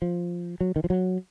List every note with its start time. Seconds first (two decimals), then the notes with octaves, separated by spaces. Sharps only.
0.02 F3
0.61 F#3
0.76 D#3
0.84 F3
0.90 F#3